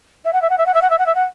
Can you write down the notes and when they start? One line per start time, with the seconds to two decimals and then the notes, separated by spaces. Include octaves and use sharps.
0.24 E5
0.33 F#5
0.41 E5
0.49 F#5
0.58 E5
0.66 F#5
0.74 E5
0.81 F#5
0.90 E5
0.98 F#5
1.06 E5
1.15 F#5